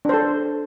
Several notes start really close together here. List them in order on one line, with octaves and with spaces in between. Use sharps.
D4 C5 A4